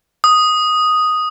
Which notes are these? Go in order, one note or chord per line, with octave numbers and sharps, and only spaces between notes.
D#6